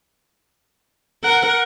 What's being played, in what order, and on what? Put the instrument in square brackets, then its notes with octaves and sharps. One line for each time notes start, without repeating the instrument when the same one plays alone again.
[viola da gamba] A#4 [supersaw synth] F#5